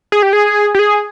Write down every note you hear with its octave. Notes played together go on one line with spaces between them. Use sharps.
G#4
G4
G#4
G4
G#4